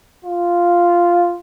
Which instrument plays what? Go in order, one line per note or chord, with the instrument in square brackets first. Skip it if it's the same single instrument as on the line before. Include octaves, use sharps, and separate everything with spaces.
[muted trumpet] F4